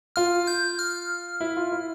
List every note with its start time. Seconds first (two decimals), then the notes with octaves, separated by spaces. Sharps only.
0.16 F4 F6
0.47 G6
0.79 F6
1.41 E4
1.57 F4
1.72 E4